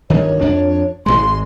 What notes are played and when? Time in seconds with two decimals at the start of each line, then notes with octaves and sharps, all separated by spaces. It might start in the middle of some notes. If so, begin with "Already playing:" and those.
0.10 D1 G1 D#3 C#5
0.41 F2 D4
1.06 G#1 C#2 G#3 C6